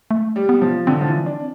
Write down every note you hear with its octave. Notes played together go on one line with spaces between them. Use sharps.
A3
G3
B3
F3
D3 C4
F3
E3
D4